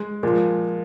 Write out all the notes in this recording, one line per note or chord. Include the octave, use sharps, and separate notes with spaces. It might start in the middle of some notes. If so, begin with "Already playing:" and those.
Already playing: G#3
A#2 F3 G#3